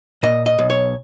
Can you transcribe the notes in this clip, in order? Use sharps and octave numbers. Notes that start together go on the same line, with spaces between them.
A#2 D#5
D#5
B1
C#5